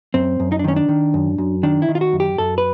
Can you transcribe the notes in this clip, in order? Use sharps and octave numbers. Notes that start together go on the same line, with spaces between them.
F#2 C4
F#2
D#4
D4
D#3 C#4
D4
D#3
F#2
F#2
D#3 D4
E4
D#3
F4
F#4
F#2
G4
F#2 A4
B4